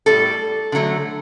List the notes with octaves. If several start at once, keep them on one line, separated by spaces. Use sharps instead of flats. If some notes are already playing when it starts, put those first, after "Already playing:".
A2 G3 A4
D3 F#3 A3